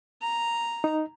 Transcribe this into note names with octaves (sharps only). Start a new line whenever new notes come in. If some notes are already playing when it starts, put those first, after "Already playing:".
A#5
D#4